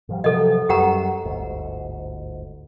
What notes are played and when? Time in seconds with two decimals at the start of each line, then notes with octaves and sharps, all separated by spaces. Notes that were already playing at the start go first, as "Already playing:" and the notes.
0.09 G#2 F3 G3
0.24 C3 F3 F#3 A4 D#5
0.69 F#2 G3 G4 F#5 A#5
1.25 G1 D2 G#2